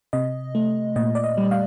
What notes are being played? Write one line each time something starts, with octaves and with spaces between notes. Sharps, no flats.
C3 D#5
A3
A#2 D#5
D5
D#5
G3
F5